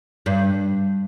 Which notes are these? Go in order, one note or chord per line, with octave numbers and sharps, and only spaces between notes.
G2